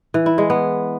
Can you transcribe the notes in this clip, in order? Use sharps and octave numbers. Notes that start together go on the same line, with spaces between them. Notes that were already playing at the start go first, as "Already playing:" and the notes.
E3
E4
G#3
B3